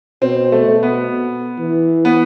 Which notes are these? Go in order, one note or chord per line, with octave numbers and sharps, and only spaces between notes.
B2 C4
A3
B2
B3
E3
B3